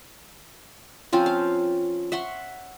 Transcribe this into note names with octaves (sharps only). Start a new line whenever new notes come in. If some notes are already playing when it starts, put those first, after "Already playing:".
F3 C4 C#4 F4
F5
E5 F#5 C6 C#6